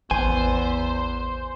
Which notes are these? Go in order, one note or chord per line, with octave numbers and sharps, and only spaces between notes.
A1 E2 B3 C5 G#5